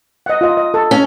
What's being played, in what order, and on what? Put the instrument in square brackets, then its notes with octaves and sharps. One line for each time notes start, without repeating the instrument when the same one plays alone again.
[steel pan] D#5 F#5
F4 D#5
D#5
A4
[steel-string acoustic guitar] C#4